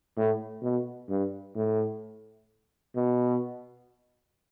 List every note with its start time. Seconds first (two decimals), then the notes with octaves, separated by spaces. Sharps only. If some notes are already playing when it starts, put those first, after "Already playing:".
0.17 A2
0.63 B2
1.09 G2
1.56 A2
2.96 B2